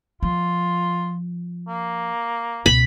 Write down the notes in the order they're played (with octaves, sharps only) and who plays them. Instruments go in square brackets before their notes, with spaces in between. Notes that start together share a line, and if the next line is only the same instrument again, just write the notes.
[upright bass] F3 [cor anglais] F4
[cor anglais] A#3
[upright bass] C#2 B2 [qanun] B5